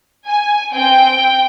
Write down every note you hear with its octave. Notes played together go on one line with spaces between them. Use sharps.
G#5
C4 G5